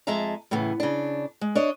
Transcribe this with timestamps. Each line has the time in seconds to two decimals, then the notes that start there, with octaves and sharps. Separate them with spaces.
0.07 F2 G#3 E5 A5 A#5
0.51 A2 C#3 E3 B3
0.80 C#3 D4
1.41 G#3
1.55 D4 C#5 D#5